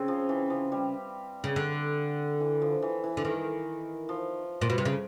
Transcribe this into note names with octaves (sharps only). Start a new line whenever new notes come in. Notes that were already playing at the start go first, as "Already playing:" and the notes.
Already playing: C#3 C4
F3
E3
F3
G3
C#3
D3
E3
F3
E3
E3
D3
D#3
F3
A#2
B2
C3
C#3